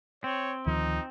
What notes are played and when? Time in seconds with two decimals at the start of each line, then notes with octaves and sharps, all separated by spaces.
0.24 C4 C#5
0.66 D2 D#3 F3 D#4